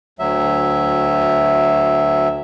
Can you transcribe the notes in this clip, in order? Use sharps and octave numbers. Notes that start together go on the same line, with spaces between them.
D2 F#3 E5